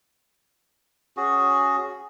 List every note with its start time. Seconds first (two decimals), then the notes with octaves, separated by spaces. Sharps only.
1.17 C#4 F#4 G#4